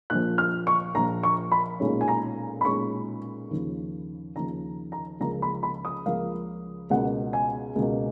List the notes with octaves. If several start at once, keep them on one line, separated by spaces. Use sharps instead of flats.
A#1 A#2 F3 F#6
F6
C#6
A#1 A#2 F3 A#5
C#6
B5
B1 A#2 G#3 C#4
G#5
A#5
B5
B1 A#2 G#3 C#4 C#6
D#2 C#3 F3
D#2 C#3 F3 A#5
A#5
C#2 C#3 F3 A#3 A#5
B5
B5
D#6
C#2 C#3 F3 A#3 F5
C#2 B2 A#3 F#5
G#5
C#2 B2 A#3